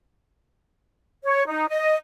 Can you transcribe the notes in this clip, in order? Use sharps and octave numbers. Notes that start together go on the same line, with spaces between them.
C#5
D#4
D#5